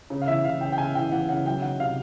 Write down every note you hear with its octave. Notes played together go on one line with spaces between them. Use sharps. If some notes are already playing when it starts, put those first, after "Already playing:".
C#3
F5
E3 E5
E3 F5
C#3 G5
G5
C#3 G#5
E3 G5
E3 F#5
C#3 F#5
F#3 G5
D#3 F#5
C3 F5